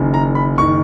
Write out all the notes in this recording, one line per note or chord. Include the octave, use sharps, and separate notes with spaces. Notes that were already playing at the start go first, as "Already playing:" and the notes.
Already playing: F#1 F#2 D#3
A#5
B5
F#1 D#3 C#6